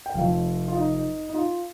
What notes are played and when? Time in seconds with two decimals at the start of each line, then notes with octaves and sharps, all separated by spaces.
0.06 G5
0.14 F1 F2 F3 F5
0.68 F4
0.75 D#4
1.29 D#4
1.34 F4